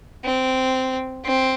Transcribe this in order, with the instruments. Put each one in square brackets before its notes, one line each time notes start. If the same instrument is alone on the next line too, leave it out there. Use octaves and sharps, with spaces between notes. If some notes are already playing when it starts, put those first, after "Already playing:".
[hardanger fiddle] C4
C4